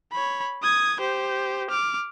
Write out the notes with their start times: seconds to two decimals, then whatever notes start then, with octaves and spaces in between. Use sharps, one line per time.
0.12 C#5 B5
0.63 D#6 G#6
1.00 G4 C5
1.70 D6 F6